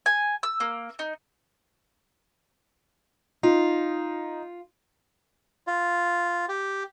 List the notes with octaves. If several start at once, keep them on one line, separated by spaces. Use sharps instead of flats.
G#5
E6
A#3
D#4
D#4 F4
F4
G4